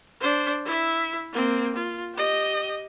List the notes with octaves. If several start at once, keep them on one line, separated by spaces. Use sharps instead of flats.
D4 C5
E4 E5
A#3 C4
F4
G4 D#5